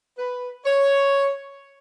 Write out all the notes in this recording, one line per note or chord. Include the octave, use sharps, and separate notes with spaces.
B4
C#5